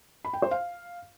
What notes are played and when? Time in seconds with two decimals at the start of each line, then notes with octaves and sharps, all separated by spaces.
0.25 B5
0.33 G5
0.42 C5
0.51 F5